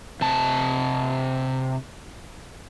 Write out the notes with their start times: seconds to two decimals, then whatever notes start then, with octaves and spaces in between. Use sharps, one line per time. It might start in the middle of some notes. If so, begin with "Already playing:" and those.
0.21 C3 A5